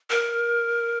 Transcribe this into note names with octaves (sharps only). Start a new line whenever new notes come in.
A#4